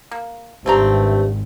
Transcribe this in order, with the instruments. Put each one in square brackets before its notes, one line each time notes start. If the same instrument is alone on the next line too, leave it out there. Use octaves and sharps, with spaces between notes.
[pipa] A#3
[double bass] G#1 [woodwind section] G2 C3 [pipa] A3 C4 A#5